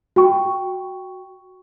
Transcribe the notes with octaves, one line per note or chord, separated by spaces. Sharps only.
F#4 G5 C#6